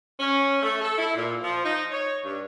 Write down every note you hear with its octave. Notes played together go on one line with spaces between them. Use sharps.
C#4
A3
A4
E4
A#2
F3
D#4
C#5
G2